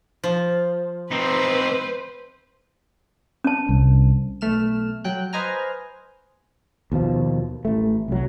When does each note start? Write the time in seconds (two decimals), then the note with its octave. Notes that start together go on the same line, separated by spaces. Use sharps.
0.24 F3
1.12 C4 D#4 B4 C5
3.44 C#4 A5
3.69 C2
4.41 B1 A3 F6 E7
5.04 F#3 G5 F#6
5.33 B4 C5 D#5 G#5 A#5 F6
6.92 D#2 B2 F3
7.65 A1 A3
8.08 C2 F#3